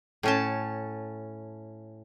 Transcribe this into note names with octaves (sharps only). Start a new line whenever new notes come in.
A2 C#4 A5